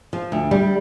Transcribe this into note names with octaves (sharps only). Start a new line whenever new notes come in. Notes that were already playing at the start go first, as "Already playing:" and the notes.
F3
D2
G3